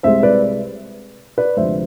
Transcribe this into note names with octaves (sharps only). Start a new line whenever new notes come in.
C2 C3 G#3 C5 E5
B4 D5
B4 D5
D2 C3 F3 G#3 C5 E5